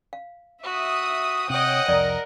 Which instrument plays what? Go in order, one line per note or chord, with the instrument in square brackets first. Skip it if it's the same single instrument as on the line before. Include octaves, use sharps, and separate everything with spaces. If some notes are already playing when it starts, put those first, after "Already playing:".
[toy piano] F5
[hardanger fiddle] F#4 [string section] E5 D#6
[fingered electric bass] C3 [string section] C#5 G5 D#6 [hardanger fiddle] D#5 F#5
[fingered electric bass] C2 F2 [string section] A#4 [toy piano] D5